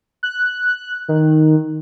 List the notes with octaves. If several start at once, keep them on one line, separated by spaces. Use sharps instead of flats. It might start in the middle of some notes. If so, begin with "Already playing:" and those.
F#6
D#3